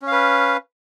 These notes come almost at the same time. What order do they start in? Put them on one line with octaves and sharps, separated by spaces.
C#4 F5 B4